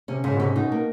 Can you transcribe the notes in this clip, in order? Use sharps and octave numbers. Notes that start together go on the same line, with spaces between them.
C3 C#4
G#2 C#3
B2
C3 C#4
B2 D#4
A#3